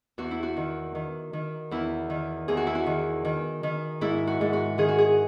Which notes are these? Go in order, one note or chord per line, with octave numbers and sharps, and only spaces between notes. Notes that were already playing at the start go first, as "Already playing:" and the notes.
E2 F#4
E4
F#4
D#3
D#3
D#3
E2 E4
D#3
E2 G#4
F#4
E4
F#4
D#3
D#3
D#3
G#2 E4
F#4
G#2
F#4
D#3 G#4
F#4
G#4